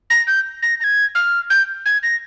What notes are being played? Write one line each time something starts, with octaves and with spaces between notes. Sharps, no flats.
A#6
G6
A#6
A#6
G#6
F6
G6
G#6
A#6